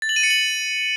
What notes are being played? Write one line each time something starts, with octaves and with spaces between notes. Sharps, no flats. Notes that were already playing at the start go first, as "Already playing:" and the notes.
A6
F#7
D#7
C#7
F#7